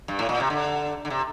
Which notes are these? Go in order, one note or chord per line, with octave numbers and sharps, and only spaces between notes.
G2
A2
A#2
C3
D3
D3
C3